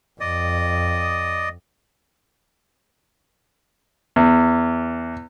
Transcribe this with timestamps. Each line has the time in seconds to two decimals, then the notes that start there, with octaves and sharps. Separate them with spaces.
0.21 F2 D5 D#5 D#6
4.16 E2